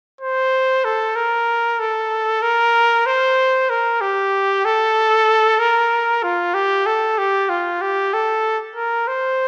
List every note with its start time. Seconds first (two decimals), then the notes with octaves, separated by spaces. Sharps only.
0.21 C5
0.85 A4
1.16 A#4
1.80 A4
2.42 A#4
3.06 C5
3.70 A#4
4.01 G4
4.65 A4
5.59 A#4
6.23 F4
6.54 G4
6.86 A4
7.18 G4
7.49 F4
7.82 G4
8.14 A4
8.76 A#4
9.08 C5